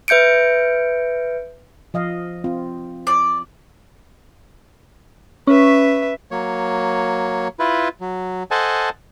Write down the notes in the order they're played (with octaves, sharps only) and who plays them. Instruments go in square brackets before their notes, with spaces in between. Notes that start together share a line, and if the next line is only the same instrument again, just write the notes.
[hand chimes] B4 E5 G6 C#7 D7
[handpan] F3 D#5 F5
C4 F4
[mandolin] D5
[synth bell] C#4 [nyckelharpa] B4 E5
[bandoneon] F#3 A#3 C#5
E4 F4 B4
F#3
A4 C5 D#5 F#5 G#5 A5